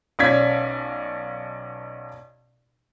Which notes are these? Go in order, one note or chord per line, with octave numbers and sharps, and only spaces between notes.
B1 C#4 D5 F5 G#6 B6